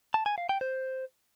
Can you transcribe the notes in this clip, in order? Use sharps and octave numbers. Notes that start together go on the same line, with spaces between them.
A5
G#5
F5
G5
C5